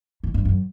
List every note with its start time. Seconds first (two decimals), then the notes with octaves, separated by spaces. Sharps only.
0.24 G#2
0.34 G2
0.45 F#2